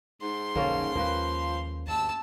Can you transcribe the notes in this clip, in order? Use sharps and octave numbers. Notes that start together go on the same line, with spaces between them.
G#2 C6
B1 F2 D3 A#3 C#4 A4
D#2 F3 G#3 A#3 B4
D2 G2 A5 E6